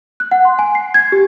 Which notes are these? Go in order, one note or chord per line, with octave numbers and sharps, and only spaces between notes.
F#6
F#5
C6
G#5
C7
G#6
G4